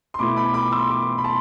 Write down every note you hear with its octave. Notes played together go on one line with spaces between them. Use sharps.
C6
B2 A3 E4 B5 D6
B5 D6
B5 D6
C6 E6
B5 D6
B5
A5 C6